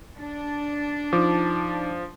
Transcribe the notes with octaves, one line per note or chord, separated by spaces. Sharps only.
D4
F3 D#4 D6